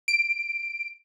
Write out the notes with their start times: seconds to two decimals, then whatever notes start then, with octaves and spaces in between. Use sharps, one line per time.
0.08 D7